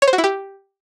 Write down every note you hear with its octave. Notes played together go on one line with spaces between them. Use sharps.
C#5
C5
F#4
E4
G4